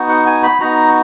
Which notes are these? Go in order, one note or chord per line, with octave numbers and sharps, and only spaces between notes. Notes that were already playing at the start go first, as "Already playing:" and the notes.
Already playing: B3 D#4 F#4
F#5
G#5
B5
B3 D#4 F#4 A#5